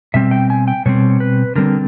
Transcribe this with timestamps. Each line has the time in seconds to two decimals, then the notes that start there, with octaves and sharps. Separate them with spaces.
0.14 B2 G3 C4 E5
0.31 G5
0.50 G#5
0.68 G5
0.86 B2 G3 C4 C#5
1.20 B4
1.56 D3 G3 C4 A#4